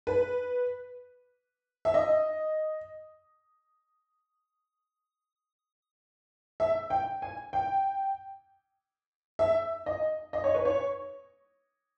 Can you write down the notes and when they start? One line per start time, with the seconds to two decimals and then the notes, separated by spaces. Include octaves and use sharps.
0.07 B4
1.85 E5
1.94 D#5
6.60 E5
6.90 G5
7.22 G#5
7.53 G5
9.39 E5
9.86 D#5
10.33 D#5
10.44 C#5
10.55 B4
10.65 C#5